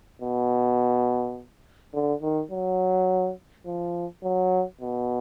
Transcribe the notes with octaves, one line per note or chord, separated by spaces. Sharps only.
B2
D3
D#3
F#3
F3
F#3
B2